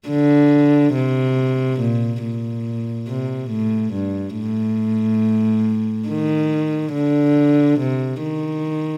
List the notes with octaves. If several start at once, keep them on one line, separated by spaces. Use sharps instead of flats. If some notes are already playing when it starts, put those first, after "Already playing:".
D3
C3
A#2
A#2
C3
A2
G2
A2
D#3
D3
C3
D#3